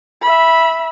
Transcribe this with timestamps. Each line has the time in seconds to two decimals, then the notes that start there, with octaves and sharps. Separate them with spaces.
0.22 E5 B5